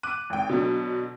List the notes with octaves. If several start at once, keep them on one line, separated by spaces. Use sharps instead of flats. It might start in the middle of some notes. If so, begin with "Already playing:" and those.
D6 F#6 D#7
G#1 G5
B2 D3 F#3